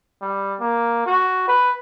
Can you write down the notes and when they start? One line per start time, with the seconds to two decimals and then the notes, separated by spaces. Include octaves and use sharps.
0.22 G3
0.60 A#3
1.06 F#4
1.48 B4